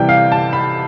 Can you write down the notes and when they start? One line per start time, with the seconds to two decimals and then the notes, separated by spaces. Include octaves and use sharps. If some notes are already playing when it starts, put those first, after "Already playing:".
Already playing: C3 E3 G3 G5
0.09 F5
0.32 A5
0.53 B5